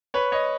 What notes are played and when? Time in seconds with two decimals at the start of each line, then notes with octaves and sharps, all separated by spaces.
0.14 B4 C#5
0.32 C#5 D#5